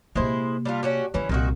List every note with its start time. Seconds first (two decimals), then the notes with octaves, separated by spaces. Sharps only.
0.15 C3 G#3 A#3 E4 C5
0.65 G3 D4 F4
0.83 C#4 F#4 G4
1.14 D3 E3 G3 C#4
1.29 C2 A#2 D#3 F#4